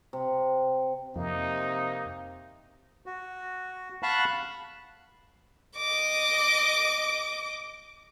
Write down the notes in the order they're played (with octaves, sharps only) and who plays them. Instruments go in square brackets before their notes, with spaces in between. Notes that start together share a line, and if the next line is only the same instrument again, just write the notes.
[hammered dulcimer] C3
[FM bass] F2 [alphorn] C3 [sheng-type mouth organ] A#3 [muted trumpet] D#4
[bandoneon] F#4
F5 F#5 A5 B5 C#6 F#6
[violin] D#5 D6